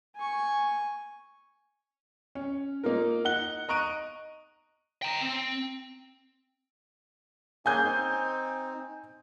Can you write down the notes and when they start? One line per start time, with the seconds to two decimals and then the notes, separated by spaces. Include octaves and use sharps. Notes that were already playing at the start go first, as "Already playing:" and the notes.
0.16 G#5 C#6
2.35 C#4
2.84 A#3 D#4 F4 A#4
3.25 D#4 F#5 F#6 G7
3.69 D#5 A#5 C#6 F#6 D7 D#7
5.02 G5 A#5
5.21 C4
7.66 A#3 C#4 G#4 G#5 G6 G#6
7.84 C4 D#4